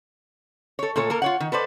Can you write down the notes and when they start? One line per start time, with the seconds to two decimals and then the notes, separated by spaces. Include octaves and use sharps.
0.79 A4 C#5
0.96 A#2 A3 A4 C#5
1.10 A#3 A4 A#4
1.22 F4 C#5 F#5
1.40 D#3
1.52 A4 B4 C5 D5